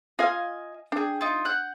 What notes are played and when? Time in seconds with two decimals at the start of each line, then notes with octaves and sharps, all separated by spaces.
0.19 F4 D#5 F5 G#5 F6
0.92 D4 G#4 G5
1.21 D#4 F4
1.45 F#5 F#6 G6